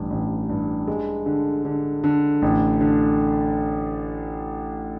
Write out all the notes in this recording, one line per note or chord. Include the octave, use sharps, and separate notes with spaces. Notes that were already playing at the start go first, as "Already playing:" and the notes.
Already playing: A1 G2
A1
G2
G#3
D3
D3
D3
A1
D3